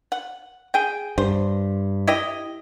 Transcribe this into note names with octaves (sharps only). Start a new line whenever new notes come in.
F#5
G#4 G5
G2 C5
E4 G4 D#5